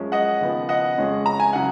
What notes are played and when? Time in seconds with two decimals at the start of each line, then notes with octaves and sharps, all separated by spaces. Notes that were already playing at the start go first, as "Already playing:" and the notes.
Already playing: F#2 F3 G#3 C#4
0.12 D#5 F#5
0.41 D#2 C#3 F3 B3
0.69 D#5 F#5
0.98 F2 C#3 G#3 C#4
1.26 A#5
1.40 G#5
1.53 C#3 F#3 F#5